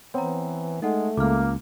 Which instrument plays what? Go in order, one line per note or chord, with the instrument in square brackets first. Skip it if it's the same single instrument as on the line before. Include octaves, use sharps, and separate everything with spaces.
[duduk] E3 [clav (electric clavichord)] B3 C4 [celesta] C#5 A#5
[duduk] G#3 [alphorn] A3 [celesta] D#4 A4 F#5
[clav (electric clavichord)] C#2 [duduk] A#3 [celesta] D6 F6